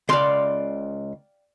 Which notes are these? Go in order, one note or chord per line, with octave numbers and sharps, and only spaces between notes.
C#2 D5 F5 G5 C6